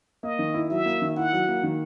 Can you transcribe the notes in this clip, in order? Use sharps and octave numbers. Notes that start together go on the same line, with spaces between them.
A#3 D#5
D#3
E4
F#3 E5
A#3
D#3
E4 F#5
F#3
A#3
D#3